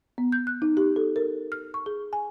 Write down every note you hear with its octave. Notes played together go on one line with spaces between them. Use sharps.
B3
G6
F#6
D#4
G4
A4
A#4
F6
C#6
G#4
G#5